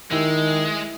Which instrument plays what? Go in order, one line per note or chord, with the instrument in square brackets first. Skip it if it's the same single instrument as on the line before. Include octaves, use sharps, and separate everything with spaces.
[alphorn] D#3 [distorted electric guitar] G#3 [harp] E4 G4 E5